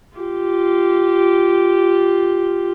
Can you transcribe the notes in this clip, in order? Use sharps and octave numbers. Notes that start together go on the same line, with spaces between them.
F4 G4